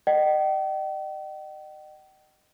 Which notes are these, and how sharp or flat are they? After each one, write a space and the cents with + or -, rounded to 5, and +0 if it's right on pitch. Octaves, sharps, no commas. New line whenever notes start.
D#5 -35 G5 -40